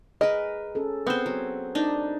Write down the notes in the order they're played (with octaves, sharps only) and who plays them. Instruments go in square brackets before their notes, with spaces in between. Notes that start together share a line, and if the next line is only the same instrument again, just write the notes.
[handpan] G#4 [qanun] A#4 B4 [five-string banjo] D#5
[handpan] C#4 G#4 A4
[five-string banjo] B3 [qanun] C4 C5
[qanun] F#3
[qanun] D4 D#4 [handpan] A#4